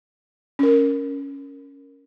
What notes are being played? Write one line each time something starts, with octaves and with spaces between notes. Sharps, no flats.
C#4 A#4